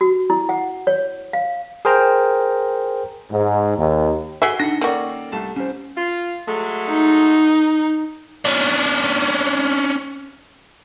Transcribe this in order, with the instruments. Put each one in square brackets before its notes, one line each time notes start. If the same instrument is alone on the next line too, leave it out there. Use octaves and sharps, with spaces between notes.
[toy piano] F#4
E4
F#5
C#5
F5
[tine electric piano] G#4 A#4 C5 G5 A#5
[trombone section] G#2
D#2
[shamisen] F#4 G#4 E5 [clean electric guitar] A4 [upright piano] C7 G7
[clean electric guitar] D4 D#4 F#5 [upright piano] A#6
[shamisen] D#3 F#4 [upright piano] A#3 C#4 D5 [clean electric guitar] A4 G5
[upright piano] C2 A3 A5
[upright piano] C2 [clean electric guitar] C#4 C5
[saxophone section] F4
F#3 G#3 A3
[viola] D#4
[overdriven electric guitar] C#4 D4